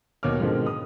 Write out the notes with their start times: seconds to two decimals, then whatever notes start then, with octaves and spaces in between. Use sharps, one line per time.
0.23 D#2 B2 C#5 D6 F6
0.40 G#2 B2 D3 D#3 F3 C4
0.67 D#6